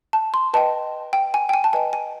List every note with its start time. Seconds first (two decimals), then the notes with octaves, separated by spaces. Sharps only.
0.13 A5
0.34 C6
0.54 B4 D#5 G5 A5
1.13 G5
1.34 G#5
1.49 G5
1.54 G#5
1.64 A5
1.73 B4 D#5 G5 G#5
1.93 G#5